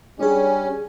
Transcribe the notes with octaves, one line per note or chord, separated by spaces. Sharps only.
G3 C#4 D4 G#4